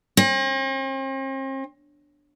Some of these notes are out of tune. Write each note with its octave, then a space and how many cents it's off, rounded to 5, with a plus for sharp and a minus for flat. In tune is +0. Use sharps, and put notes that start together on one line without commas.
C4 +45